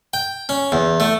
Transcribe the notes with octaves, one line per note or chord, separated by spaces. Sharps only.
G5
C#4
E2
A3